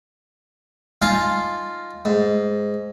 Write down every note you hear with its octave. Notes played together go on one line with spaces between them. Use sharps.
D#4 F4 F5 G#5 A5
G#2